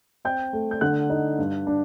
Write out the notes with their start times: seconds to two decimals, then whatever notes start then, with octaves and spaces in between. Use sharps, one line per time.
0.25 C4 G5 G6
0.53 A3
0.71 G6
0.81 D3 F#5 F#6
1.10 D#4
1.39 G2
1.67 D4